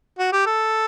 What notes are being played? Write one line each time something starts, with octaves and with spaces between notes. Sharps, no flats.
F#4
G4
A4